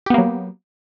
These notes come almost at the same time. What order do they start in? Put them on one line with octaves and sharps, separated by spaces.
G4 B3 A#3 F#3